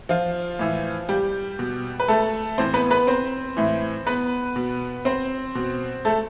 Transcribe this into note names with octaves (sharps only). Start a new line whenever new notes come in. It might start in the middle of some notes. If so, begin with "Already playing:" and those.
F3 F4
A2 E3
G3 G4
B2
B4
A3 A4
A2 E3 C4 C5
B3 B4
B3 B4
C4 C5
A2 E3
B3 B4
B2
C4 C5
B2
A3 A4